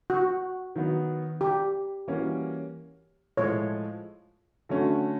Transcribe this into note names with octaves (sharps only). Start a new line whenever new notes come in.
F#4
D#3 F#3 B3
G4
E3 G3 A#3 C#4 F#4
A2 F3 G#3 C#5
D3 F#3 A3 C#4